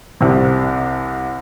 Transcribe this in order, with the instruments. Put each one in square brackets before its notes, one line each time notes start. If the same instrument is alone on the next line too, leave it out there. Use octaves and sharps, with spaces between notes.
[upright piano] C2 C3